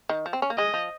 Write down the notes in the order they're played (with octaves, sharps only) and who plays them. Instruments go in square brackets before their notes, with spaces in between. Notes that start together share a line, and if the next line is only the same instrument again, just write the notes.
[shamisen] D#3
F3
C4
C#4
A#3
[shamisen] G#3 [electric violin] D#5
[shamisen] F3